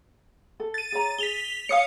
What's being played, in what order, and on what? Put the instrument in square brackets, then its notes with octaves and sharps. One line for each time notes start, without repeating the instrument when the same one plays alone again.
[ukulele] A4
[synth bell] A6 D#7
[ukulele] G#4 C#5 A#5
[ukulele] G#4 [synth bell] B6 F7 G7
[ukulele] C#5 [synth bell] F5 D#6 C#7